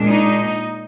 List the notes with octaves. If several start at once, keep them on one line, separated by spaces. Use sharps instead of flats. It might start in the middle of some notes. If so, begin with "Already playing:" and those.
Already playing: A#2 G#3 D4
D#4